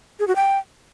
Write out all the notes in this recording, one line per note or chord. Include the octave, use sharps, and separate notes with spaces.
G#4
F#4
G5